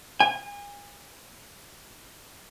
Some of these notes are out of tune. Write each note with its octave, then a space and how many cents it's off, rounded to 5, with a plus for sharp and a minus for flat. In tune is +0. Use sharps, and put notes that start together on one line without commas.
G#5 -35